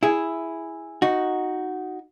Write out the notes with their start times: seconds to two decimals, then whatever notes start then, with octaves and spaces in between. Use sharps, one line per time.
0.03 E4 G#4
1.02 D#4 F#4